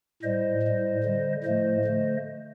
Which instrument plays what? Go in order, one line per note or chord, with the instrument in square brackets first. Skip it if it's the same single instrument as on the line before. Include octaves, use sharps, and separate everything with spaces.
[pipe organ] A2 G3 C5 D#5
A2
G3
D3 G3
A2 F3 A3 C5 D#5
D3 A3